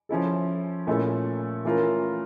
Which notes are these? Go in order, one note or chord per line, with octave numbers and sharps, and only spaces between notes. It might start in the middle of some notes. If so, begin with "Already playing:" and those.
F3 C#4 E4 A4
A#2 A3 C#4 E4 A4
E3 A3 C#4 F4 A#4